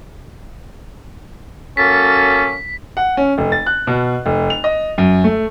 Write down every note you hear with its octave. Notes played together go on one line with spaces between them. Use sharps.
F#3 A#3 C#4 A4 A6 B6
F#5
C#4
F1
A6
F#6
B2
F1
F7
D#5
F#2
A3